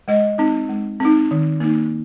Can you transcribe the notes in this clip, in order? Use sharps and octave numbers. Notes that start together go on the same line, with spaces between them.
G#3 D#5
C4 D#4
G#3
C4 D#4
D#3
A#3 D#4